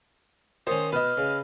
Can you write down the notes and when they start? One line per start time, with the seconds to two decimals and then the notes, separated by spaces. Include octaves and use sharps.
0.67 D#3 C#4 C5 D#6
0.92 B2 B4 D#5 F6
1.17 C#3